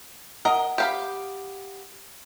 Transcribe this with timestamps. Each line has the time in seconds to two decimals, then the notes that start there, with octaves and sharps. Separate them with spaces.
0.45 A#4 D#5 F#5 A#5 D#6
0.78 G4 F5 B5